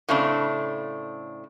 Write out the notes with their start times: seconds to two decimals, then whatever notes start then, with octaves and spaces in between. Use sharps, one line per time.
0.09 A2 C#3 A3 C4 D4